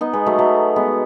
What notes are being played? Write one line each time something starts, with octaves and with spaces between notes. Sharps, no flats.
B3 D#4
G#3 B3
F#3 A3
F#3 A3
G#3 B3